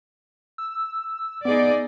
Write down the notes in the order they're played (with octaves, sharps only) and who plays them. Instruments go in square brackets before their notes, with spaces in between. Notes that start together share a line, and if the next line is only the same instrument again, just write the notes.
[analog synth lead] E6
[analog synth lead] B3 [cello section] D#4 G#4 D5